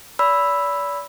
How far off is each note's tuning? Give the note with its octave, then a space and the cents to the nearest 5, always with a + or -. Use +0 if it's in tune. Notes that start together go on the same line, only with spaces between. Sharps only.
D5 -40 B5 +0 E6 +0